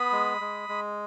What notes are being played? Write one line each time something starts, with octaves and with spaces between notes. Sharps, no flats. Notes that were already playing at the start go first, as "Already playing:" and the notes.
Already playing: B3 B5 D#6
G#3
G#3
G#3